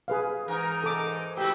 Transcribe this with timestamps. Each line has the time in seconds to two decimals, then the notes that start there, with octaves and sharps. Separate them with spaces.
0.08 G#4 B4 F5
0.48 G#2 E3 D#4 A#4
0.84 A4 D6
1.37 G#2 F#4 G4